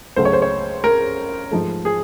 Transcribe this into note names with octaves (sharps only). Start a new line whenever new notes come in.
C#2 C#3 F#3 A3 C5
C#5
C5
C#5
A#4
G#2 F3 A3
G#4